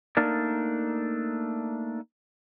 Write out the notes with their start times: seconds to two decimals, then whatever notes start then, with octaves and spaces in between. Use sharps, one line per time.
0.17 A3 A#3 D4 D#4 A#4 D5